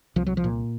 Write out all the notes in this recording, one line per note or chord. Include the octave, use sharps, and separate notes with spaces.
C2 F3
F#3
F3
A#2